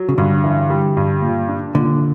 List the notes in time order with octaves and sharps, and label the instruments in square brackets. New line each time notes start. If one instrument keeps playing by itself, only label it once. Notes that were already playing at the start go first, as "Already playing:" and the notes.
Already playing: [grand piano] F#3
[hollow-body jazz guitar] C#3
[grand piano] G2 [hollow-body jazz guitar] D3
[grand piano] E3
G3
G2
A#2
D4
[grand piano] A#2 [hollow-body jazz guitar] D3